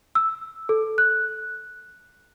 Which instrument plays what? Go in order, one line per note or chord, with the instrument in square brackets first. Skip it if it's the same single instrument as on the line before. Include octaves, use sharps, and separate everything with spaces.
[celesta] E6
A4
F#6